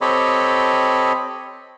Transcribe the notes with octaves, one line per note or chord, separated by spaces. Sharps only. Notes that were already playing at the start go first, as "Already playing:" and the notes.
C4 G4 A4 C#5 D#5 B5